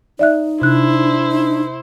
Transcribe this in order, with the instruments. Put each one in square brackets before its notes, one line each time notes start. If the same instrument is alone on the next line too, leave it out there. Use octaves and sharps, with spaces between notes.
[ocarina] D#4 [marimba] D5 E5 F#6
[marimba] C3 F#6 [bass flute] D4 [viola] E4 C5
[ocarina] D#4